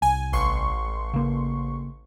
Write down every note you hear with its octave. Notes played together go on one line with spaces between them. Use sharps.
C2 G#5
A1 C6 C#6
C#3 A#3